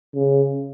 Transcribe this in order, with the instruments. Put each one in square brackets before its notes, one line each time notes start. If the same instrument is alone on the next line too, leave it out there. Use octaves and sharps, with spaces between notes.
[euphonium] C#3